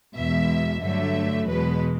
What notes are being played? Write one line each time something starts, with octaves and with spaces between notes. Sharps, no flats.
E2 B2 G#3 E5
G2 D3 F#3 A3 E5
E2 B2 G#3 B4